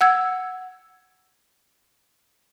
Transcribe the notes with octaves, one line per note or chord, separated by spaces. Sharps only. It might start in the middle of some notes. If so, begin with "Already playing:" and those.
F#5 E6 G#6